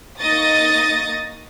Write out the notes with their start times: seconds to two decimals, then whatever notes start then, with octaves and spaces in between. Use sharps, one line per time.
0.20 A#3 D#4 D#5 C#6 D#6 A6